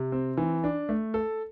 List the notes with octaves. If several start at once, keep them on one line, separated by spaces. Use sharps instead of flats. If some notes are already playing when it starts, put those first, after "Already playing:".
Already playing: C3
C4
E3
D4
A3
A4